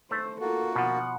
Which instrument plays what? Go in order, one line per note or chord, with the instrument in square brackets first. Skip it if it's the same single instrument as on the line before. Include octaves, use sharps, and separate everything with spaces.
[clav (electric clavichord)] A3 [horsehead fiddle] C5
[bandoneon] A#3 F#4 [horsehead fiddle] F4 A4
[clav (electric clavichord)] B2 F3 [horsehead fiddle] F#5